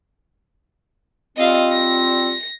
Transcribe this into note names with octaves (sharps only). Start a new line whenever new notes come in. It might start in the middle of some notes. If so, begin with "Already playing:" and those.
G3 C4 F4 D#5 F5
A#6